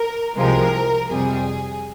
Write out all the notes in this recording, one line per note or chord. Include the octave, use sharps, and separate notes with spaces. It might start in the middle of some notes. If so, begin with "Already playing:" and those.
Already playing: A#4
C2 C3 F3 G#3 A#4
F2 C3 G3 G#4